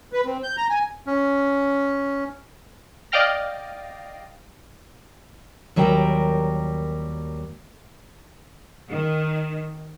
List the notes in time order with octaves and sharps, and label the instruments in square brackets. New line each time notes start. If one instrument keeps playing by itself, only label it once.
[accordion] B4
C4
G6
A#5
G#5
[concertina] C#4
[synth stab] D5 D#5 F5 G5 F6 A#6
[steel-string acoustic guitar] D#2 F#3 G3 A#4 G5
[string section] D#3